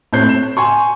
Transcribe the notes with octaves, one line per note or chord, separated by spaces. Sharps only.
A2 C4 G6 C7
E7
G#5 C6 C#6